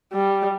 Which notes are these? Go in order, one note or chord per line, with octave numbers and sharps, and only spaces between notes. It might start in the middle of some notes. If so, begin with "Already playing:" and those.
G3